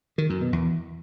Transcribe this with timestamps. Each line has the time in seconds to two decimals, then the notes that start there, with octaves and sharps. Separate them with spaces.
0.18 D#3
0.30 F#2
0.41 B2
0.53 E2